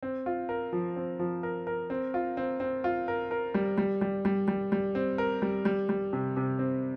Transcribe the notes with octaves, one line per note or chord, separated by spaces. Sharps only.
C4
F4
A#4
F3
C4
F3
A#4
A#4
C4
F4
C4
C4
F4
A#4
A#4
G3
G3
G3
G3
G3
G3
C4
A#4
G3
G3
G3
C3
C3
C4